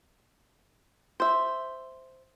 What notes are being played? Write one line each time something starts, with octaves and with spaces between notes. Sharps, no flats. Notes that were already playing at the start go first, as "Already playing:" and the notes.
C5 E5